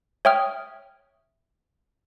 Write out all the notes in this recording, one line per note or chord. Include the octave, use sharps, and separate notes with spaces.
C#5 E5 G5 D#6 F6